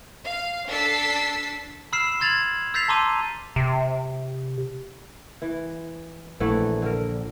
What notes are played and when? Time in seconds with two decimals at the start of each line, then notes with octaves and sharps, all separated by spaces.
0.25 F5
0.68 D4 A4 E6 A6 B6 C7
1.93 B5 E6 F6 C7 E7
2.20 C6 F6 G#6 A6 F7 F#7
2.74 E6 G6 A6 B6 C7 F7
2.88 A5 A#5 C6 D6 E6 D#7
3.56 C3
5.42 E3
6.40 A#1 E3 A3 F#5
6.82 D3 A#4